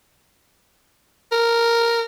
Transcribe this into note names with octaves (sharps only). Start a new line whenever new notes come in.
A#4